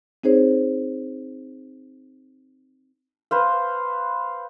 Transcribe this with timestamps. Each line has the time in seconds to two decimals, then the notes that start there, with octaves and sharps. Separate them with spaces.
0.24 C4 D#4 G#4 C5 C#5
3.31 B4 C5 F5